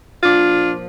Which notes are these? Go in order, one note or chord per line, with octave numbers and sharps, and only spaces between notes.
A#2 F3 D4 F4